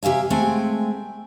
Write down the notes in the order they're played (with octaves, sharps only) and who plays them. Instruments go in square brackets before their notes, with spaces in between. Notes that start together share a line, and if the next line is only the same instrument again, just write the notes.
[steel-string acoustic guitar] C3 G4 E5 F5 G#5
G#3 A3 C4 G5 G#5